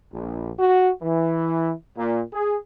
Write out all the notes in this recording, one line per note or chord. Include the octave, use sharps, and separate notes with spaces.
A#1
F#4
E3
A#2
G#4